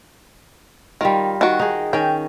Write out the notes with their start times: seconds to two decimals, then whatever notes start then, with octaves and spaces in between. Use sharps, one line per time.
1.01 D#3 G3 F4 A#4
1.41 D#3 F#4
1.59 D#4 G#4
1.93 D#3 C#4 G5